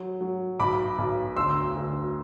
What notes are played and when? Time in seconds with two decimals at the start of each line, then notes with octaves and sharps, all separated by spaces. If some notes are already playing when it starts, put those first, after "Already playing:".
Already playing: F#3
0.21 F#3
0.59 B1 B5 D6
0.98 B1
1.36 D2 C6 E6
1.75 D2